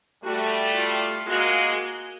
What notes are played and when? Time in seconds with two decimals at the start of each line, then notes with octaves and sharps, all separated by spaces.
0.24 G3 A3 F#4
0.76 F4
1.27 G#3 A#3 F#4